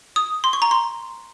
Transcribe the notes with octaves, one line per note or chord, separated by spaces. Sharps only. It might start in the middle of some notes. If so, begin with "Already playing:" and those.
D#6
C6
C#6
A#5
C6